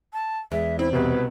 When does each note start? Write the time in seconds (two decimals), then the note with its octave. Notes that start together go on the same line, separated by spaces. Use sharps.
0.13 A5
0.52 E2 G#3 E5
0.79 C4 E4
0.93 C2 B2 B4